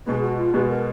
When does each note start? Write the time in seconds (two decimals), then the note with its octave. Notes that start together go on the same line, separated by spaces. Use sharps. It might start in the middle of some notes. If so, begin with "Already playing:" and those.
0.06 B2 G#3 B3 G#4
0.23 F#4
0.38 F4
0.54 B2 G#3 B3 F#4
0.69 A#4